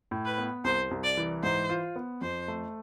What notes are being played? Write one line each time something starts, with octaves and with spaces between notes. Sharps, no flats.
A2
B4
B3
C2 C5
C2
D5
E3
G#2 C5
F4
B3
F2 C5
A3